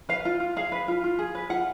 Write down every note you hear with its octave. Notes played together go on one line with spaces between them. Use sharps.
B4 F5
F4
F4
G#4 F5
B4
F4
F4
G#4
B4
F4 F#5